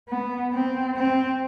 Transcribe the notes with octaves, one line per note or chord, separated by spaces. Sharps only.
B3
C4
C4